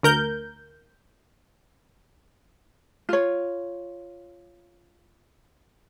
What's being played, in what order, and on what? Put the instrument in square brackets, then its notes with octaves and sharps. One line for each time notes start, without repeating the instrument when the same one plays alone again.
[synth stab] D2 A#4 G6
[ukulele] F4 C#5